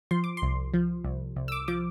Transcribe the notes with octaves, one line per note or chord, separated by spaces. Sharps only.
F3 C6
D6
C6
C2
F3
C2
C2
E6
D6
F3 D6